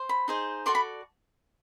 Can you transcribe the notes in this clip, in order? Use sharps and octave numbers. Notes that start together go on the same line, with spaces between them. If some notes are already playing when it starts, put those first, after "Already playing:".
Already playing: C5
B5
D#4 G#4 C5
F#4 A4 D5 C6
B5